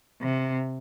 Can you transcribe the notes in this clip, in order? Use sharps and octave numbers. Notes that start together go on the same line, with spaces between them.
C3